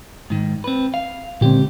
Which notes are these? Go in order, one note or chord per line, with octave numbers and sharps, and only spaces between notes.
G#2 D#3
C4 B4
F5
C#2 A#2 D3 C4 G4